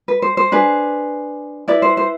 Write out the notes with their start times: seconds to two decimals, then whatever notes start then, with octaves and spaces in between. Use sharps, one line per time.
0.08 B4
0.22 C5
0.37 C5
0.52 D4 G#4 B4
1.68 E4 B4 D5
1.82 C5
1.97 C5